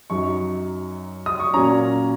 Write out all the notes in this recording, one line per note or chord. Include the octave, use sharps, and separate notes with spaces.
F#2 F#3 D#4 C#6
D#6
C#6
A#2 F#3 C#4 A#5